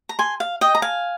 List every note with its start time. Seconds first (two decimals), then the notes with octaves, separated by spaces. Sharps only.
0.09 A#5
0.19 G#5 C6
0.40 F5
0.61 D#5 G5
0.75 A#5
0.82 F5 G#5